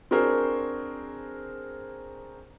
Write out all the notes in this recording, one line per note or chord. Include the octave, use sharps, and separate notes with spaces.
C4 D4 F#4 G#4 A#4 C5